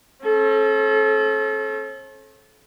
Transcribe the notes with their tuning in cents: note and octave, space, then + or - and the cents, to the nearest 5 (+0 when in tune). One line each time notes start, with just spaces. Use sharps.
C#4 -45 A4 -30